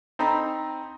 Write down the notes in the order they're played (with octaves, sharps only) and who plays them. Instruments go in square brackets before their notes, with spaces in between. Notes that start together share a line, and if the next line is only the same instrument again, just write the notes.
[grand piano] C4 D#4 A4 A#5 B5